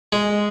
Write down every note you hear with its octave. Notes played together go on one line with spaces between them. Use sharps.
G#3